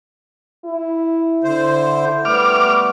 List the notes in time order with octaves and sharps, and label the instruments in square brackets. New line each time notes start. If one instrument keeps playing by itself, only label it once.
[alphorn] E4
[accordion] D3 C5
[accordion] G3 A3 B3 [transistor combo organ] D6 F6